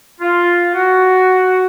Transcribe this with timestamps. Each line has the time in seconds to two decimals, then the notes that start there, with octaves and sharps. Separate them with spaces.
0.21 F4
0.74 F#4